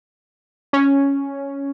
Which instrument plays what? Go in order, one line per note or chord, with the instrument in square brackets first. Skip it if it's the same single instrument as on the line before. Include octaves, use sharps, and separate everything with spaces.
[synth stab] C#4